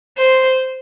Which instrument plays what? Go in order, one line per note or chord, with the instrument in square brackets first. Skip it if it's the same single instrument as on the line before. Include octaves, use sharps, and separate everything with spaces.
[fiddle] C5